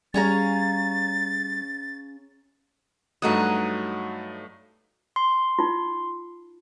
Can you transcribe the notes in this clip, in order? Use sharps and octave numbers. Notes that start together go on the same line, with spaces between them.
G3 C#4 G#4 C#5 F5 A#5 A6
G2 F#3 A3 D#4 F#4 D#6
C6
D#4 F4